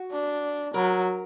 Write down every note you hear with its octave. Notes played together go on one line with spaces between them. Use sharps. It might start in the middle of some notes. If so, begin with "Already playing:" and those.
Already playing: F#4
D4
F#3 A#4